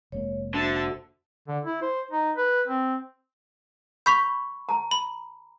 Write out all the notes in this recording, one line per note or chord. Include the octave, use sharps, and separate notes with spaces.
F1 G#3 A#3 C#5
D3 F#4 C5 E5 A5
D3
E4
C5
D#4
B4
C4
B5 C#6 G6 B6 F7
A5 A#5
B5